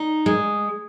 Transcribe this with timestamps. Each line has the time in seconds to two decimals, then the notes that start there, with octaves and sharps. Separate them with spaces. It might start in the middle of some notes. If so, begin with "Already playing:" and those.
Already playing: D#4
0.26 G#3